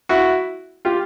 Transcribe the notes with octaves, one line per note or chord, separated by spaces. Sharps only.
E4 F#4
F4 G4